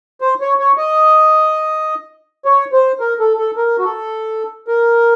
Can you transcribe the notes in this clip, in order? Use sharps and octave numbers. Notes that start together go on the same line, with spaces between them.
C5
C#5
C#5
D#5
C#5
C5
A#4
A4
A4
A#4
F#4
A4
A#4